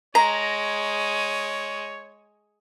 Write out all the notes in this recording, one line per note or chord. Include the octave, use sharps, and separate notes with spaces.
G#3 C#5 A#5